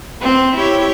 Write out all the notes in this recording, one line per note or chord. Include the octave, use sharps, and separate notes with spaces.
C4
E4 G4 C#5